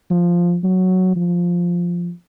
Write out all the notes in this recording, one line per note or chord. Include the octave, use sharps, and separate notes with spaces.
F3
F#3
F3